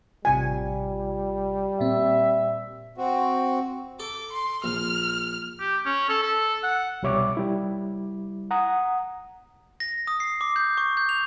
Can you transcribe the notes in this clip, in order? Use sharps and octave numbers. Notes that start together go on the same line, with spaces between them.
A1 C3 G3 F4 G#5
A#2 C4 E5
C4 F#4
A4 D6
C6
A#1 F6
G4
C#4
A4
A4
F#5
C2 B2 G3 C#5 E5 D6
G3 E4
F#5 A#5 D#6
A#6
D#6
C7
D6
G6
C#6
G6
F7